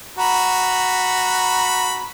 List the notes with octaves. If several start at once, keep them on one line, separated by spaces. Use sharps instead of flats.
F#4 A#5 B5